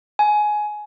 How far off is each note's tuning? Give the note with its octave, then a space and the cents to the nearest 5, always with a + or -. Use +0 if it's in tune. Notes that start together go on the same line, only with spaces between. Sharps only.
G#5 +15